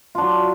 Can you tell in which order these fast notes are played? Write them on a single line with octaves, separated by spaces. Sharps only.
F4 D4 F#3